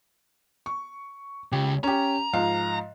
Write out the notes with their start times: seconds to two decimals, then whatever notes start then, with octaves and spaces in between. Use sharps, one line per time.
0.66 C#6
1.52 C#2 C#3 G4
1.84 C#4 G4 A#5
2.33 G#2 F3 F5